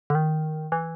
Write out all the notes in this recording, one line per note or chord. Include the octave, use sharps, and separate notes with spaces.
D3
D#3
E3